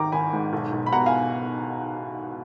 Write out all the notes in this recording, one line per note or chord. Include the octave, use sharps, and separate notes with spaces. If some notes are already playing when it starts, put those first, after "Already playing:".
Already playing: G#1 D#3 A#5 D6
G#1 G#5 B5
G#2
B1
B1
B5
B2 F#5 A#5
F5 G#5